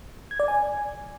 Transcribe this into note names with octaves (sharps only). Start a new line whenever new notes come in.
G#6
D5
G#5